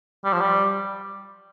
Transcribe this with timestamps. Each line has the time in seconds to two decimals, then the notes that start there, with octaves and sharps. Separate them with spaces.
0.25 G3
0.33 F3
0.41 G3